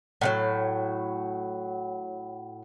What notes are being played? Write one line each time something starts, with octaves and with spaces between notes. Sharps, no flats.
A2 D3 F#3